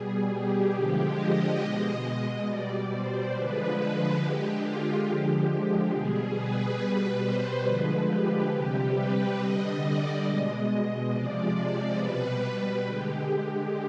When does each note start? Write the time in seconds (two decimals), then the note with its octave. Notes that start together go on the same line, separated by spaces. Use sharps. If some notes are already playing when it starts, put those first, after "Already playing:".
Already playing: B2 G3 G#4
0.29 G4
0.72 D3 F3 G#3 G4
1.16 D#5
1.60 B2 G#3 D#5
2.46 B2 G3 D5
2.90 C5
3.32 D3 F3 G#3 B4
4.19 D3 G#3 G4
4.63 F4
5.05 D3 F3 G#3 G4
5.48 G4
5.92 B2 G3 G#4
6.36 B4
6.78 B2 G3 B4
7.22 C5
7.65 D3 F3 G#3 B4
8.09 G4
8.52 C3 G3 G4
8.95 B4
9.38 D3 G3 D#5
9.81 D5
10.25 B2 G#3 D#5
10.68 D#5
11.11 C3 F3 G#3 D5
11.97 B2 G3 B4
12.84 D3 G#3 G4